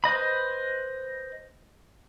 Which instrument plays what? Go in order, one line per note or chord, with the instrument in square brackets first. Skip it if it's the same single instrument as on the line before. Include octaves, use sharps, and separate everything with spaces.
[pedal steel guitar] B4 C5 D#5 B5